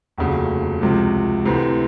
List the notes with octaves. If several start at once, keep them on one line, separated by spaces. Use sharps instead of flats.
F1 D#2 C#3 F#4
C#2 C3 F3
D2 C3 E3